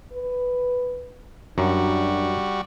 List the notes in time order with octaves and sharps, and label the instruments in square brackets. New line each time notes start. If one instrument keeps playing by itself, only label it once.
[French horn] B4
[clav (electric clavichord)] F#2 [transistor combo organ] G3 F#4 [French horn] D4